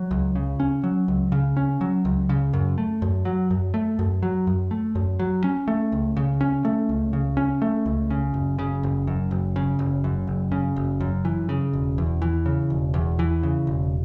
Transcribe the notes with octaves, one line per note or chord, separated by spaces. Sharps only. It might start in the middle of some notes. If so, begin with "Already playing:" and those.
Already playing: F#3
C#2
C#3
C#4
F#3
C#2
C#3
C#4
F#3
C#2
C#3
F#2
A3
F#2
F#3
F#2
A3
F#2
F#3
F#2
A3
F#2
F#3
C#4
A3
C#2
C#3
C#4
A3
C#2
C#3
C#4
A3
C#2
C#3
F#1
C#3
F#1
F#2
F#1
C#3
F#1
F#2
F#1
C#3
F#1
F#2
E3
C#3
E1
E2
E3
C#3
E1
E2
E3
C#3
E1